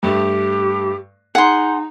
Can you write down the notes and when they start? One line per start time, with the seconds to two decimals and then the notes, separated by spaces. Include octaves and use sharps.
0.03 G2 A3 G4
1.35 D#4 G#4 F#5 C6